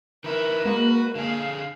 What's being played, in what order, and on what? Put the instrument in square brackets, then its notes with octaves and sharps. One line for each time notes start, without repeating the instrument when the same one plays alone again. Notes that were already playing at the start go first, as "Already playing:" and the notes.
[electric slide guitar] D#3 E4 [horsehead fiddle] A#4 B4
[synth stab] G#3 A#3 [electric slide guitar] F#4
[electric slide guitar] D3 G#4 [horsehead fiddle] F5